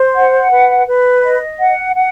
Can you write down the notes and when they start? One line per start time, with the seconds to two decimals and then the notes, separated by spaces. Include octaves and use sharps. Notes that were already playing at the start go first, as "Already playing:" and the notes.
Already playing: C5
0.15 F#5
0.51 B4
0.87 B4
1.23 D#5
1.59 F#5
1.96 F#5